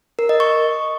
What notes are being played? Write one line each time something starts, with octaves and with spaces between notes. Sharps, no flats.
A#4
D#5
C#6